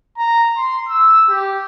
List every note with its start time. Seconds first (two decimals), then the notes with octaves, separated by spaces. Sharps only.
0.18 A#5
0.57 C6
0.88 E6
1.30 G4